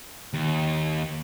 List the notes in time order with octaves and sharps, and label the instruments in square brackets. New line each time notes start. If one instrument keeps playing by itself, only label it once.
[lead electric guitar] D#2